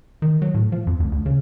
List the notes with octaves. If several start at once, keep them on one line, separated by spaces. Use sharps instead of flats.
D#3
F#3
A2
F3
F2
D2
D2
C#3